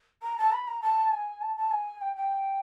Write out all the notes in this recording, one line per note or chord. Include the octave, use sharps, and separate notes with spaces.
A#5
A5
B5
A#5
A5
G#5
A5
A5
G#5
G5
G5